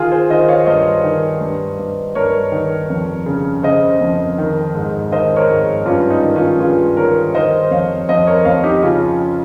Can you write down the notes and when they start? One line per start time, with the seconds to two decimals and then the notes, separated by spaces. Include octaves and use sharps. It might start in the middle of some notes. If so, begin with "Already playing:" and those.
Already playing: D#3 F4 G#4
0.11 G#4 C5
0.30 D#3 C5 D#5
0.48 C#5 F5
0.67 G2 C5 D#5
1.04 D#3
1.41 G2
1.79 G2
2.15 G2 A#4 C#5
2.52 D#3
2.90 F2
3.26 C#3
3.63 C#3 C5 D#5
4.01 F2
4.38 D#3
4.74 G#2
5.11 D#3 C5 D#5
5.36 A#4 C#5
5.49 G#2
5.86 G2 C#4 F4
6.10 D#4
6.24 D#3
6.36 C#4 F4
6.60 G2 F4 G#4
6.97 D#3 A#4 C#5
7.35 D#3 C5 D#5
7.71 F2 C#5 F5
8.09 F2 C5 D#5
8.27 A#4 C#5
8.45 F2 C#5 F5
8.64 D#4 G4
8.82 C#3 C#4 F4